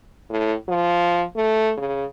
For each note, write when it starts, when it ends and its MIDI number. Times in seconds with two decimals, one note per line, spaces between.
0.30 0.53 45
0.68 1.23 53
1.36 1.72 57
1.77 2.05 49